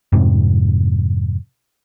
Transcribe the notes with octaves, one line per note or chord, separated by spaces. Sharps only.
F2 G#2 C3